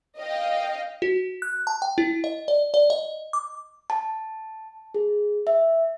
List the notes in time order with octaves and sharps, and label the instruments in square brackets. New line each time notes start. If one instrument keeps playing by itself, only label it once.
[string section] D#5 F5 G5
[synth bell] F#4
F#6
A5
G5
E4
D#5
D5
D5
D#5
D6
[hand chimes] A5
G#4
E5